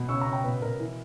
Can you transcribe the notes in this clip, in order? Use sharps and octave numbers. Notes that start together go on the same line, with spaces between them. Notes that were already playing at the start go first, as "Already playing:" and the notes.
Already playing: B2
C#3 C#6 E6
A#5 C#6
C#3
G5 A#5
B2 B4
B2 A#4
E3